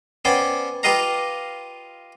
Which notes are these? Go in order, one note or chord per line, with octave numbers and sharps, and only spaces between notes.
B3 C#4 C5 D5 G5
F4 G4 B4 D#5 F5 A#5